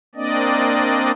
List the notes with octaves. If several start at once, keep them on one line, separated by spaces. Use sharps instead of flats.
A#3 C4 D4 D5 D#5